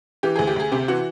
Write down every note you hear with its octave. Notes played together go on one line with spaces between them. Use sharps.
E3 G4
D2 G#4
G4
D2 G#4
C3 G4
E3 F#4